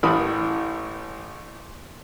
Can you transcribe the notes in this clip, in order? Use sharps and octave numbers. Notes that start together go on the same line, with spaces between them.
A1 A2 B5 D#6